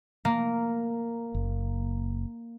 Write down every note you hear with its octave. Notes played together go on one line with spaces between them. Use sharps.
A#3
F#1